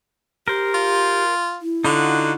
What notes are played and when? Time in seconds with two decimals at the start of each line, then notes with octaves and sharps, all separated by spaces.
0.48 G4 A#4 C5
0.74 F4
1.62 E4
1.85 D3 D#4 F4 F#4